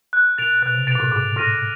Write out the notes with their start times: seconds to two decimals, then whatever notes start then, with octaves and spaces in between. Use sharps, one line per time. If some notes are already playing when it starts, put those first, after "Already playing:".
0.13 F#6
0.38 A#2 A6 D7 F7
0.62 B2 F#6
0.74 C3
0.87 B2 A6 D7 F7
0.95 A#2
1.00 A2
1.11 G#2 D6
1.36 A2 F6 A#6 D#7